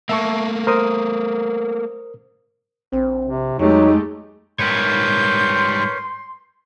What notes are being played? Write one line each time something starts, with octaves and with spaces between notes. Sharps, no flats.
A3 A#3 E5 A5 C#6
A#4 C5 D#6
A#1 C4
C3
F2 F#3 G#3 A3 D#4 G4
G#2 G3 A#4 B4 C#5 C6 G6